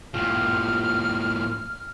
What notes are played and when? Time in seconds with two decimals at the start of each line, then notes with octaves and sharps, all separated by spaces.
0.14 A2 F3 F6